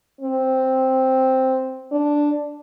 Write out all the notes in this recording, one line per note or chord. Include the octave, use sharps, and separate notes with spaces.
C4
D4